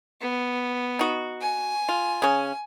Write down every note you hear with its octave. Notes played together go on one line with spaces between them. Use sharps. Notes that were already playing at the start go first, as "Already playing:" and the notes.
B3
D#4 F#4
G#5
F4
C#3 C#4